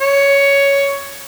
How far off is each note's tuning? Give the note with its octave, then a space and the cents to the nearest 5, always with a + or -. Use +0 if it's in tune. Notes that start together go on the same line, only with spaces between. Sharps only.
C#5 +10